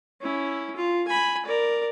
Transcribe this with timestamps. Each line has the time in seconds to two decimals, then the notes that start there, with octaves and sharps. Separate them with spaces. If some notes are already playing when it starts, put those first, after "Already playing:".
0.21 C#4 E4
0.76 F4
1.08 G#5 B5
1.46 A#4 D5